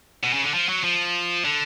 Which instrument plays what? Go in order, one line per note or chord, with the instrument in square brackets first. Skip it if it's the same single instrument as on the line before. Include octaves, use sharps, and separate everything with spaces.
[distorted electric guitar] B2
C#3
D3
F3
F#3
F3
D3